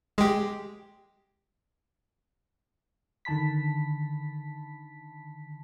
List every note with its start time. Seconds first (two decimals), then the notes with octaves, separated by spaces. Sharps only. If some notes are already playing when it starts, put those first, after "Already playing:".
0.18 G#3 G4
3.25 D3 D#3 A5 B5 B6